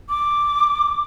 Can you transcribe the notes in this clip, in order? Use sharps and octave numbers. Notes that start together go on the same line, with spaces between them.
D6